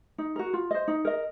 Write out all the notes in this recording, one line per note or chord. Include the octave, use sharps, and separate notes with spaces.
D#4
F#4 A#4
F4
C5 D#5
D#4
A#4 D#5